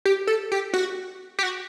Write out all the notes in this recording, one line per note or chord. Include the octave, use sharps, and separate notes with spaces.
G4
A4
G4
F#4
G4
F#4